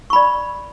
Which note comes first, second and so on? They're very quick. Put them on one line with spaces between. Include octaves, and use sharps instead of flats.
C#6 B5 D5